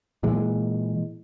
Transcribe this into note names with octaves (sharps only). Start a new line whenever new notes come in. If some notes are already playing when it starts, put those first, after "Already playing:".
A#2 E3 G#3